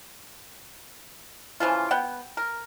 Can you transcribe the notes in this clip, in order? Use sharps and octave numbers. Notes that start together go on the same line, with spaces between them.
C#3 E3 F3 F4
B3 F#5 G5
A#4